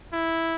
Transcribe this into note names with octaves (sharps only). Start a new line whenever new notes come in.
E4